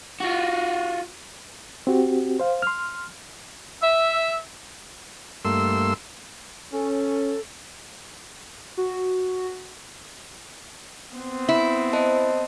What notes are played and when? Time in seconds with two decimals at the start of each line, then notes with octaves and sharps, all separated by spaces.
0.20 F4 F#4
1.87 C4 F#4 G4
2.40 C5 F5
2.62 C6 F6
3.82 E5
5.45 G2 A3 A#3 C6 E6
6.73 C#4 A4
8.77 F#4
11.15 B3 C4
11.49 E4
11.93 C5 D#5 A5